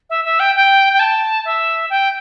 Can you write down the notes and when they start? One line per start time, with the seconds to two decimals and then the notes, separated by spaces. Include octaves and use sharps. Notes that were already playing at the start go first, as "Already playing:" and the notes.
0.10 E5
0.25 E5
0.40 G5
0.55 G5
0.93 G5
0.99 A5
1.45 E5
1.90 G5